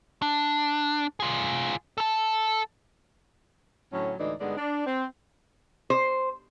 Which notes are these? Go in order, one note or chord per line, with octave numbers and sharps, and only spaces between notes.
D4
F4 G#4
A4 A5
A2 D3 F#3 C#4
D2 A2 E3 G#3 D#4 D5
G2 D3 G#3 B3 D#4 D5
D4
C4
C5